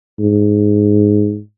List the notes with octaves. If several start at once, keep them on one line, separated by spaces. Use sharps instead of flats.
G#2